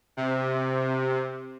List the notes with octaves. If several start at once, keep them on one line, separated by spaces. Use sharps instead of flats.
C3